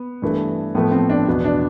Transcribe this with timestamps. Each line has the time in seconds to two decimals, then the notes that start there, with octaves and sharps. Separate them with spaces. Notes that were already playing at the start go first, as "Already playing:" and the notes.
Already playing: B3
0.22 G2 E3 A3
0.75 A2 F3 A3 B3
0.91 C4
1.10 D4
1.27 E2 B2 B3
1.44 D4